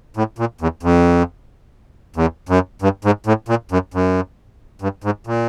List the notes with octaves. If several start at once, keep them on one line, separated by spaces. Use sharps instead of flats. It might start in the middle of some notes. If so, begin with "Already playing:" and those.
A2
A#2
E2
F2
E2
F#2
G2
G#2
A2
A#2
F#2
F#2
G2
G#2
A#2